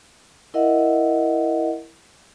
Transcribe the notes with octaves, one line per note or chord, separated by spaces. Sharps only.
E4 A#4 D#5 E5 F#5